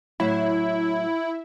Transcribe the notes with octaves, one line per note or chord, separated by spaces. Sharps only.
A2 F#3 E4 E5